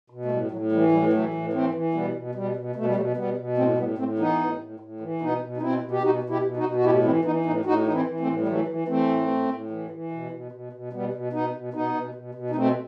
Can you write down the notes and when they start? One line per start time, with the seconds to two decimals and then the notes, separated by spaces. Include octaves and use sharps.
0.10 B2
0.25 A3
0.32 A2 G3
0.51 A2 F#3
0.72 E3 G3
0.92 A2 G3
1.13 E3 F#3 A3
1.34 A2
1.53 E3 A3 C4
1.74 E3
1.94 B2 G3 B3
2.15 B2
2.35 B2 G3
2.56 B2
2.76 B2 A3
2.86 G3
2.95 B2 F#3 A3
3.16 B2 G3 B3
3.37 B2
3.57 A2 A3 C4
3.78 A2 G3 B3
3.98 A2 A3 C4
4.18 E3 B3 D#4
4.40 A2
4.60 A2
4.80 A2
5.01 E3
5.21 B2 B3 D#4
5.41 B2
5.57 D#4
5.61 B2 C4 E4
5.82 B2
5.91 G4
6.02 B2 D#4 F#4
6.23 B2
6.30 E4 G4
6.43 B2
6.56 D#4 F#4
6.63 B2
6.75 F#4
6.84 A2 E4 G4
7.04 E3 C4 E4
7.25 E3 B3 D#4
7.46 A2 B3 D#4
7.65 A2 D#4 F#4
7.86 E3 D#4
7.93 C4 E4
8.07 E3
8.20 A3 C4
8.27 A2
8.40 G3
8.47 E3 F#3 A3
8.68 E3
8.88 E3 A3 C4
9.08 A2
9.30 A2
9.49 A2
9.71 E3
9.90 E3
10.11 B2
10.31 B2
10.52 B2
10.73 B2
10.93 B2 G3 B3
11.13 B2
11.33 B2 B3 D#4
11.54 B2
11.73 B2 B3 D#4
11.94 B2
12.14 B2
12.35 B2
12.50 D#4
12.55 B2 A3 C4